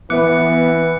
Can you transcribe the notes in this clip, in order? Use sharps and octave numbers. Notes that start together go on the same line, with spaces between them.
E3 B3 B4 E5 D6 F#6 C#7